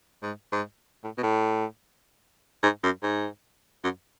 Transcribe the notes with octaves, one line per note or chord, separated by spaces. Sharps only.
G#2
G#2
A2
B2
A2
G#2
F#2
G#2
F#2